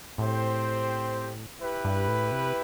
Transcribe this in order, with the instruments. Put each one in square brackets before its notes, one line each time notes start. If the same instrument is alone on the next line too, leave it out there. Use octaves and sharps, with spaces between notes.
[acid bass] A2 [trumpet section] C4 G4 C5
[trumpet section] E4 G4 B4
[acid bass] G2
A2
C3